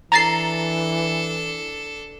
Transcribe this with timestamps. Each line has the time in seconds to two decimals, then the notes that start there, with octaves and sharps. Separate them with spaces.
0.12 E3 D4 A4 A#5 A6 C7